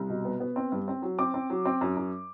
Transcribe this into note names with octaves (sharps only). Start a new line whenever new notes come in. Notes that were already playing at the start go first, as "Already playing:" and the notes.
Already playing: C2
B2
B3
B3
C4
G2
C4
F#3
C4 D6
C4
F#3
C4
F#2
F#2